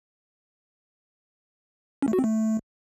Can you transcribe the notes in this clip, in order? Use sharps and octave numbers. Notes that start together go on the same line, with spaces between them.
C#4
A3
F#4
C4
A3